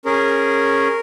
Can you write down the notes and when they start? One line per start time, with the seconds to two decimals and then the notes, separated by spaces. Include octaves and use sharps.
0.05 C#4 G#4 A#4